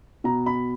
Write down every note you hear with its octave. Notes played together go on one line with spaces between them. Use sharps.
B2 A#5
B5